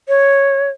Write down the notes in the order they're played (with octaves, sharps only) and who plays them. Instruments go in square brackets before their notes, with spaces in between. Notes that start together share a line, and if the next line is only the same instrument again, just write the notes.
[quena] C#5